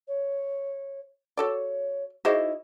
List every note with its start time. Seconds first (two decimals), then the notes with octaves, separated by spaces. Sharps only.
0.07 C#5
1.37 F#4 A4 C#5 D5
2.25 D#4 E4 F#4 G#4 C5 D5 D#5